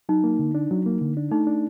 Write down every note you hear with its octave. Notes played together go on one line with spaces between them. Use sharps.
F#3 D#4
A#3
D3
D4
F#3
A#3
D3
D4
A3 D#4
D4